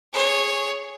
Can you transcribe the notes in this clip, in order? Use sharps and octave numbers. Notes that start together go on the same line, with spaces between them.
G#4 C#5